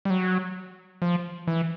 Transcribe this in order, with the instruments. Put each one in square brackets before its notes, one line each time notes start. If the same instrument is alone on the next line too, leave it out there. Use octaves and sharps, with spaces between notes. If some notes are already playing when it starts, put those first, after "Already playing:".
[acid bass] G3
F#3
F3
E3